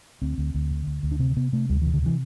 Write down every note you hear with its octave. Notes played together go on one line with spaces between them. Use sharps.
D2 C4
D2
D2
D3
D2
D2
D4
C3 C4
C3 B3
C3 A3
D2 G3
E3
C3
D3
C3 E3